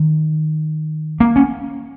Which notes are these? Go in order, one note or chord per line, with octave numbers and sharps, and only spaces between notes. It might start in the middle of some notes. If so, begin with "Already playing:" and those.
Already playing: D#3
A#3
C#4